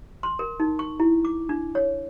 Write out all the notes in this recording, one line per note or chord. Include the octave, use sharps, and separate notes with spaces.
C6
A#4
D#4
C#6
E4
D6
D4
C#5